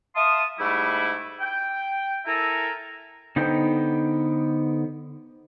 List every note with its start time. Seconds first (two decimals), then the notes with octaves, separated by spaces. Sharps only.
0.15 E5 F5 A5 C6 D#6
0.59 G#2 G3 A3 E4
1.40 G5
2.26 E4 A4 A#4 E5 G#5 A#5
3.36 D3 B3 D#4 C5 G5